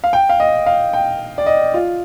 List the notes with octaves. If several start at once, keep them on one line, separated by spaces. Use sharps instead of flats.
F5
G5
F5
D#5
F5
G5
D5
D#5
F4